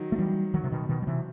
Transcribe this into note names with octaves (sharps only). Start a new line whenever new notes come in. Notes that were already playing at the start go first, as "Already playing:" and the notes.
Already playing: D#3 F#3
A3
E3 G3
D#3 F#3
C3
B2 D#3
B2 D#3
F#3
C3 E3